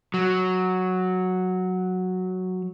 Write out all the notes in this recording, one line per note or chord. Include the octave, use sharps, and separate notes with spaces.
F#3